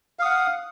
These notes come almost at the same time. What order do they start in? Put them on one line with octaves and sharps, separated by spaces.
F5 D#6 F#5